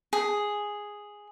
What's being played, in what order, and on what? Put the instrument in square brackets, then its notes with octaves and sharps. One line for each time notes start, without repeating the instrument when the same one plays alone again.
[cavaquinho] G#4